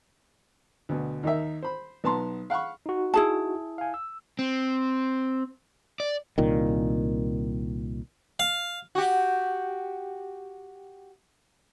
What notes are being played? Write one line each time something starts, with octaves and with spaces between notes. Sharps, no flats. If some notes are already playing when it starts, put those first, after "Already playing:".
D2 B2
D#2 D#4 A#4 E5
C5 B5
B1 B3 A5 A#5 C6
F5 F#5 B5 C#6
D#4 F#4
E4 G#4 A5
F5 G#5
E6
C4
D5
C2 A#2 D#3
F5
F#4 G4